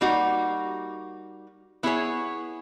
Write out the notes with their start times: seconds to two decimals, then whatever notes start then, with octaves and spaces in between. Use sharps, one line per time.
0.01 G3 A#3 D#4 F#4
1.83 B3 E4 G#4 C#5